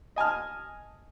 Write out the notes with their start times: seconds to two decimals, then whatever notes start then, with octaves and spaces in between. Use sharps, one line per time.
0.16 D#5 G#5 A5 F6